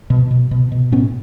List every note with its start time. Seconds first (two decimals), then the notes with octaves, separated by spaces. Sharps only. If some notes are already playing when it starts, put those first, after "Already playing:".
0.10 B2
0.31 B2
0.51 B2
0.72 B2
0.92 A2 B3 C#4